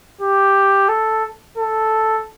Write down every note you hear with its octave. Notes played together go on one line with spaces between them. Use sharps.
G4
A4
A4